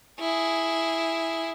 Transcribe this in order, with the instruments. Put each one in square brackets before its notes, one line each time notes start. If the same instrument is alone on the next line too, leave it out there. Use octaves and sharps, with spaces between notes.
[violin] E4 G#4